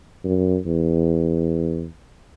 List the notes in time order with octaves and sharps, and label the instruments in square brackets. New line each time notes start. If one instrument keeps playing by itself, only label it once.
[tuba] F#2
E2